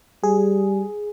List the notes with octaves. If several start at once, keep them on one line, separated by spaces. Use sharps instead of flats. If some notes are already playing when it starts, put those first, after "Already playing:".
G3 G#4